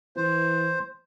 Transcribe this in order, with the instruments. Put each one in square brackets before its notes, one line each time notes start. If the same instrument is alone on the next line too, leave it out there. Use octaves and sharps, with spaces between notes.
[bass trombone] E3 [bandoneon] C5